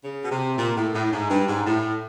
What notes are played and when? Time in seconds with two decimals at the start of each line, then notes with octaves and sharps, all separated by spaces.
0.04 C#3
0.24 B2
0.31 C3
0.57 A#2
0.76 A2
0.94 A2
1.12 G#2
1.29 G2
1.48 G#2
1.65 A2